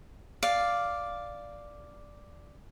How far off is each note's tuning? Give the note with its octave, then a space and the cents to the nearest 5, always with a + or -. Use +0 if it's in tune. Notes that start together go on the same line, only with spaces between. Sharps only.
D5 +0 F5 +0